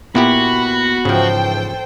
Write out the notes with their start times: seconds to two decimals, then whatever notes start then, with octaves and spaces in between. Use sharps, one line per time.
0.15 A#2 B3 E4 F#4 G4 B5
1.05 G#2 C#3 E3 F3 A4 C5 G5